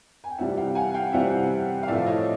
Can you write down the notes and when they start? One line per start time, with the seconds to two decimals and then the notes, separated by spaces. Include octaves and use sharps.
0.24 G#5
0.31 G5
0.38 C3 E3 G3 C4 E5 F#5
0.49 F#5
0.57 F5 G5
0.75 F#5 G#5
0.94 F5 G5
1.13 C3 E3 G3 C4 E5 F#5
1.83 F5
1.88 A2 F3 A3 D5 E5
2.06 C#5 D#5